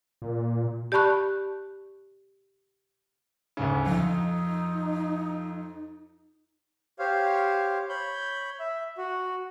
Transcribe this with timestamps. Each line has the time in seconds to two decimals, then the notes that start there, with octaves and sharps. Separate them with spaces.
0.22 A#2
0.92 G4 D5 A5 B5 C#6 F#6
3.57 D2 G#2 C#3
3.86 F2 D#4
6.99 G4 C5 C#5 F5
7.89 C#5 B5 G6
8.60 E5
8.98 F#4